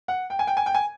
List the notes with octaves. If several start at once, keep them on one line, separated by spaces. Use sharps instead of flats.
F#5
G5
G#5
G5
G#5
G5
G#5